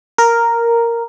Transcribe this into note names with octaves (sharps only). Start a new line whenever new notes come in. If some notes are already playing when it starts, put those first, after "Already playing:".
A#4